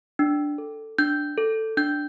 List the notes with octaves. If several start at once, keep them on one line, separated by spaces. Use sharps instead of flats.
D4
A4
D4 G6
A4
D4 G6